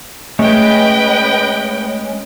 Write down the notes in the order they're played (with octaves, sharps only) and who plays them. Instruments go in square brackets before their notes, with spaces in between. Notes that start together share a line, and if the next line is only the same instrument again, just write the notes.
[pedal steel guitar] G#3 C#4 [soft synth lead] A3 [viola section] B4 D#5 G5